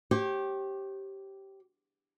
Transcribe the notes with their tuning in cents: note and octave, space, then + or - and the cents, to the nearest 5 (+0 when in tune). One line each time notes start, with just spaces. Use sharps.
G4 -10 C#5 -45